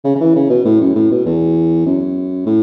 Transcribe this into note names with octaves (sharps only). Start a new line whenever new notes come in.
C#3
C#3
E3
C#3
B2
A2
F#2
A2
B2
E2
F#2
A2